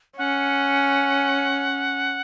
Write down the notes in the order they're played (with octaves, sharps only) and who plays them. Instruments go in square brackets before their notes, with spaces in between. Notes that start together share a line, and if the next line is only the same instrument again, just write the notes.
[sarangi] C#4 [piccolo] F#5